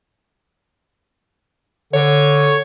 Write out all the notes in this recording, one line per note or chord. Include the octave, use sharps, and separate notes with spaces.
D3 C#5